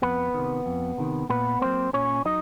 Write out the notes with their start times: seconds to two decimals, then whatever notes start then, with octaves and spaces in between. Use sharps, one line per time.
0.02 F2 B3 B4
0.34 C3 D#3
0.66 F2
0.98 C3 D#3
1.29 A#2 B3 B4
1.61 F#3 A#3 C4 C5
1.93 A#2 C#4 C#5
2.25 F#3 D#4 D#5